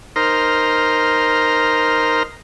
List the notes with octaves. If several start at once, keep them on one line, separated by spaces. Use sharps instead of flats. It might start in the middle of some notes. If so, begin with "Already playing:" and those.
D#4 A#4 C5 A#5 C6 F6